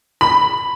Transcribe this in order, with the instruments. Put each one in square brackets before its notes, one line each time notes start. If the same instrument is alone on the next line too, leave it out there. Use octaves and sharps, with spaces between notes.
[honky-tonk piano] B5